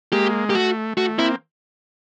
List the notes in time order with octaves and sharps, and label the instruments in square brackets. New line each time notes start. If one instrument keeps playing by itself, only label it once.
[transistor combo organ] G#3 A#3 [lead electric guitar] G4
[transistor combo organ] A#3 [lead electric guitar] G4
[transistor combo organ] A3 [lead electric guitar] F#4
[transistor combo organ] A3 [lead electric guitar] F#4
[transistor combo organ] A#3 C4 [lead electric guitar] E4